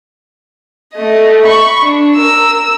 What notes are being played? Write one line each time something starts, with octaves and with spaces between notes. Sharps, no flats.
A3 D#5
B5 C#6
D4
A#4 E6